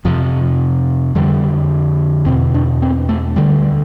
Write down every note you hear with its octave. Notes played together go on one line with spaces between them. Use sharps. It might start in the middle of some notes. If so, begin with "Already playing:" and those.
F2 C3 F3
F2 D3 G3
E2 B2 C4
D4
C4
A3
D2 D3 G3